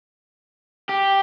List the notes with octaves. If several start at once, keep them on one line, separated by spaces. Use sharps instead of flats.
G4